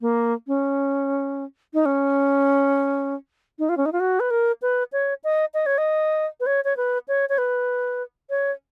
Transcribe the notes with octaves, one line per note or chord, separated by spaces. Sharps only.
A#3
C#4
D#4
C#4
D#4
F4
C#4
D#4
F4
F#4
B4
A#4
B4
C#5
D#5
D#5
C#5
D#5
B4
C#5
C#5
B4
C#5
C#5
B4
C#5